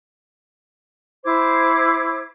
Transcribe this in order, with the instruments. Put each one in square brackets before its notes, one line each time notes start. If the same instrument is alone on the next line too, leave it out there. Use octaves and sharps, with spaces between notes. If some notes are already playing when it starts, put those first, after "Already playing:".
[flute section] E4 C5 D6 G#6